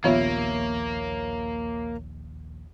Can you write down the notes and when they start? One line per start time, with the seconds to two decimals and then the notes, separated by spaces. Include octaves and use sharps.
0.04 A#1 D#2 F3 A#3 B3 F4 C#5 E5